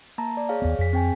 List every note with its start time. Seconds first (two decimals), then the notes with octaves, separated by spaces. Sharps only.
0.18 A#3 A5 A#5
0.37 D5
0.49 G#4 C#5 F5
0.62 D#2 B3
0.79 F2 G#4 B6
0.93 C4 G5 G#5